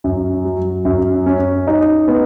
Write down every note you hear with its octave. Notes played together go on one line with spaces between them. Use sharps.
F#2
F#3
F#2
C#4
D#4
B3